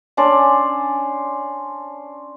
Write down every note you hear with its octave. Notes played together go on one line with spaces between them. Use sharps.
C#4 D4 C5 D5